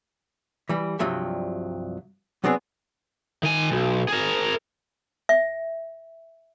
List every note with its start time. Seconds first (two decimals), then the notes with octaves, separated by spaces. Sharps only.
0.69 E3 G3
0.99 C2 G2 F3 F#3 E5
2.44 F#3 B3 C4 D4 G#4
3.43 D#3 G#5
3.72 B1
4.08 G#4 A#4
5.29 E5